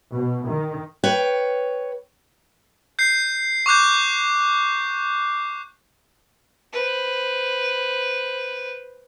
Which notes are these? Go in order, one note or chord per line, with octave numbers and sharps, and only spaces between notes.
B2
D#3
B4 C#5 G5
G6 C7
C#6 D6 F#6 G6
B4 C5